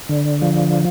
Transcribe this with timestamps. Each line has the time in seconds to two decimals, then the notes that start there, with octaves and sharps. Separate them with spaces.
0.09 D3
0.42 F3